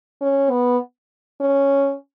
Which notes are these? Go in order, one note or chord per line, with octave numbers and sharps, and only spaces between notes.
C#4
B3
C#4